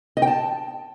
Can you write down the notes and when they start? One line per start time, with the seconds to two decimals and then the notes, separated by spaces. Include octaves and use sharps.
0.17 D#5
0.22 G5
0.27 A5